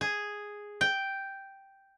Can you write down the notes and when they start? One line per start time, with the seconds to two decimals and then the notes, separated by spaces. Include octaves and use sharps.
0.01 G#4
0.81 G5